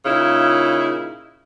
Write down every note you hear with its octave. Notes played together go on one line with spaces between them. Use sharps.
A#2 C#3 D#4 E4